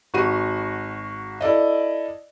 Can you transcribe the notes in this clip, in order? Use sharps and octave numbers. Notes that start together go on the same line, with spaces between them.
G#1 F#4 D#7
E4 A4 D5 D#5